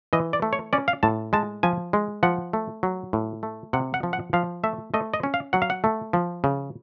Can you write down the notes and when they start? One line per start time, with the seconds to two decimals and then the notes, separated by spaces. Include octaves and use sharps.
0.13 E3 D#5
0.33 D5
0.42 A3
0.53 C#5
0.73 C#4 D5
0.88 F5
1.03 A2 A5
1.33 G#3 A5
1.63 F3 G#5
1.93 G#3
2.23 F3 F#5
2.53 A3
2.83 F#3
3.13 A2
3.43 A3
3.73 C3 F#5
3.94 F#5
4.03 F3
4.13 F#5
4.33 F3 F5
4.64 A3 E5
4.94 A3 D#5
5.14 D#5
5.23 C#4
5.34 F5
5.53 F#3 F#5
5.62 F5
5.70 F#5
5.84 A3
6.13 F3
6.44 C#3